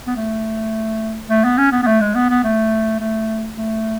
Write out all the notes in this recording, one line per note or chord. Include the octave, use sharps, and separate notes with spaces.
B3
A3
A3
B3
C#4
B3
B3
A3
G#3
B3
B3
A3
A3
A3